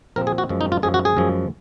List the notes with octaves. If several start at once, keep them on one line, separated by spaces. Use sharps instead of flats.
A#2 F3 C4 A#4
G#4
F#4
F#2 F3 G#3
D#4
F4
F#2 F3 G#3 G#4
F#4
G#4
F#2 F3 G#3